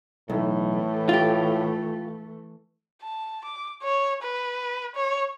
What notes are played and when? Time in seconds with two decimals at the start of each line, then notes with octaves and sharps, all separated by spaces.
0.30 B1 A2 E3 A3
1.09 F4 G4
3.02 A5
3.45 D6
3.83 C#5
4.23 B4
4.95 C#5